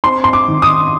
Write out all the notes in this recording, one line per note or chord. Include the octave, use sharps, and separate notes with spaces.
C4 C6
C6
D6
D#3
D#6